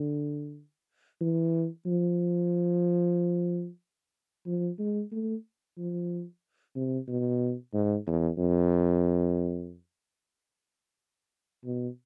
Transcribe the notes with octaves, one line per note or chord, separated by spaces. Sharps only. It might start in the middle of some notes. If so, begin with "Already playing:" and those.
Already playing: D3
E3
F3
F3
G#3
A3
F3
C3
B2
G#2
E2
F2
B2